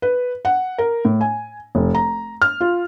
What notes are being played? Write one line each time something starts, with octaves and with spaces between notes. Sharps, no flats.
B4
F#5
A#4
A2
G#5
F1
A#5
F6
F4